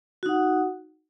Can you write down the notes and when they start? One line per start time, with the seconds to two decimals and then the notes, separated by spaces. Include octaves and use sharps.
0.23 F#4
0.26 D#4
0.29 F#5